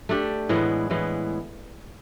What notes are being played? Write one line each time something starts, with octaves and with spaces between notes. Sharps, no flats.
A3 D4 G4
A2 E3 G#3 B3
A2 E3 G#3 B3